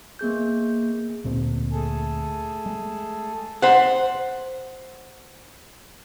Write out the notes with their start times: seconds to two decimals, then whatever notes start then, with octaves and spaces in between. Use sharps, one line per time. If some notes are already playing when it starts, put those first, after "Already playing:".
0.19 A#3 B3 G#4 G6
1.24 D2 A#2 C4
1.72 A3 G#4 A4
2.66 G#3
3.62 C5 F#5